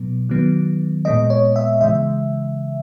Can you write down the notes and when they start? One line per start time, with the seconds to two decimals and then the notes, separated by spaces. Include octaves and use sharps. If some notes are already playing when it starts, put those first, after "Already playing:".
Already playing: B2 F#3 B3
0.29 D#3 F#3 B3
1.05 A#2 G#3 B3 D#5
1.30 C#5
1.56 E5
1.81 C#3 E3 G#3 E5